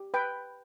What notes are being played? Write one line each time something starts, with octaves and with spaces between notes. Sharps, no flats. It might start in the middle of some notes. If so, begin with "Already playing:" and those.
Already playing: G4
B4 G5